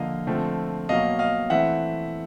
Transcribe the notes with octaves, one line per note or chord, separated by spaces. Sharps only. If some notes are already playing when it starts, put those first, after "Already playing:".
Already playing: D3 F3 A#3 D#5 F5
D3 F3 A3 C4
B2 F#3 A#3 D#5 F5
D#5 F5
E3 A3 C4 E5 F#5